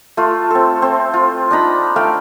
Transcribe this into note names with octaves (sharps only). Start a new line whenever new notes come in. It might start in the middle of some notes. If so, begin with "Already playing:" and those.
A3 F4
C4 A4
C4
F4
D4 D#4 A#5 B5
A3 F5 G5